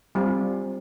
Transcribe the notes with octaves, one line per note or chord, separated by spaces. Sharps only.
G3 C4 F4